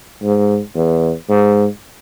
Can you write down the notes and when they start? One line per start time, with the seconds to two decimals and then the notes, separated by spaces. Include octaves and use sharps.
0.23 G#2
0.75 E2
1.29 G#2